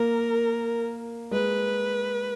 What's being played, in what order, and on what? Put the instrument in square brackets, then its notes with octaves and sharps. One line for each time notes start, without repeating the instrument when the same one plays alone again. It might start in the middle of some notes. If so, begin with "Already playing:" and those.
Already playing: [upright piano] A#3 [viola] A#4
[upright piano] G#3 [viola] B4